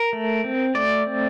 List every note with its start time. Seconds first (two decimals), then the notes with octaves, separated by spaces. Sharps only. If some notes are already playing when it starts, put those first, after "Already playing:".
Already playing: A#4
0.13 A3
0.44 C4
0.75 A3 D5
1.07 C4